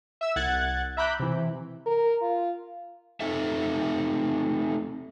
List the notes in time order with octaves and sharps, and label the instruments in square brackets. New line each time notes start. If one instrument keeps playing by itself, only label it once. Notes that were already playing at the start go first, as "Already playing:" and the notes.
[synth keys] E5 E6
C2 F#5 F#6 G#6 A6
E5 A#5 B5 D6 F#6 G6
C3 E3
[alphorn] A#4
F4
[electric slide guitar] A3 C4 D#4 A4 E5